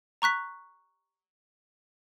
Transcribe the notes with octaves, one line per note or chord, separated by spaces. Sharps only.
A#5 C#6 F#6 B6